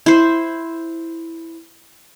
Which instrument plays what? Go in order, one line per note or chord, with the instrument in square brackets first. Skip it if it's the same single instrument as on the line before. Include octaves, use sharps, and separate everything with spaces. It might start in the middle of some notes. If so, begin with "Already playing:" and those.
[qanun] E4 C5